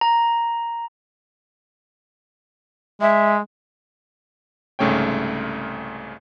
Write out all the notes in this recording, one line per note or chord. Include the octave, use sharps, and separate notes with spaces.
A#5
G#3 E5
C2 G#2 C#3 A3 C#5 G5